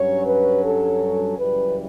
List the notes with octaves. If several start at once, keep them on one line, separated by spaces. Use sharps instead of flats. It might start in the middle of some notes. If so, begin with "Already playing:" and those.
Already playing: G2 F#3 C#4 C#5
B4
A4
F#2 C#3 E3 G3 B4